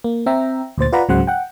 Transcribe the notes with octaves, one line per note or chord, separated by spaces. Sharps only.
A#3
C4 E5 G5 A#5
D2 A#2 C5 A6
F4 B4 D5 F#5 A#5 B5
C#2 G#2 C#3 F#3 C5 F#5
F#5 G5